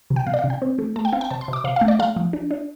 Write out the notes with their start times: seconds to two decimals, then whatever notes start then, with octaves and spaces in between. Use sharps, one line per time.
0.10 C3
0.16 G5
0.27 C3 F5
0.34 D5
0.39 F5
0.44 C3
0.50 G5
0.62 C4
0.78 A3
0.96 A3 A5
1.05 G5
1.13 C4 F5
1.21 G5
1.30 C3 A5
1.41 C6
1.48 C3
1.53 D6
1.64 C3 F5
1.76 A3 F5
1.88 D5
1.99 A3 F5
2.16 F3
2.33 D4
2.51 D4